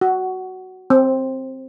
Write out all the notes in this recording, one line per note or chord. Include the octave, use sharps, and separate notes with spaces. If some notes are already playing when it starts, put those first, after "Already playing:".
F#4
C4